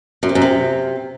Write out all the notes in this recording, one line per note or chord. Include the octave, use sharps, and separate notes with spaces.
F#2
C3
F#2
C3